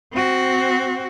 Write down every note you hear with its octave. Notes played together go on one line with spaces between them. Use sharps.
C4 F#4